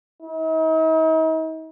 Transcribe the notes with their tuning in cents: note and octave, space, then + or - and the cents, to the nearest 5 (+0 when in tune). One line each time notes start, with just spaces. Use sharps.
D#4 +45